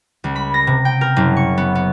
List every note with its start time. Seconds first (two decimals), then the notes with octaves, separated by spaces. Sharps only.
0.24 C#2
0.36 B5
0.54 A#6
0.67 C3
0.85 G5
1.01 A#4
1.16 F#1
1.37 C#6
1.58 B3
1.75 B3